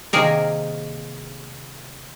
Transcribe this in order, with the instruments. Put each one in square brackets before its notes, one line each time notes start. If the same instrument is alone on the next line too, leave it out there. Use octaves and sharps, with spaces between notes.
[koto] C3 D#3 A#3 G#4 A#4